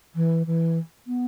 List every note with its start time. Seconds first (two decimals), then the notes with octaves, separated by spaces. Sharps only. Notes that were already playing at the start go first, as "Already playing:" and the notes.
0.15 E3
0.47 E3
1.07 B3